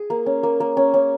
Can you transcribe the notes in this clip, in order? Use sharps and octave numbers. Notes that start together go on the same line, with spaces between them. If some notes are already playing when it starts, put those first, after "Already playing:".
Already playing: G#4
A#3
C#4
A#3
A#3
C#4
C#4